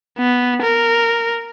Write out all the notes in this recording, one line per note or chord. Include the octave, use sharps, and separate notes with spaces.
B3
A#4